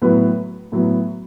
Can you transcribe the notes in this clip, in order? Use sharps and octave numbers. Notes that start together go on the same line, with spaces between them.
A2 F#3 B3 F#4 B4
A2 F#3 B3